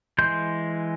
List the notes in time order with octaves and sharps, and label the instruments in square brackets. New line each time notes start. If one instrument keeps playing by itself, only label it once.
[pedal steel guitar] E3 G#3 C6 G6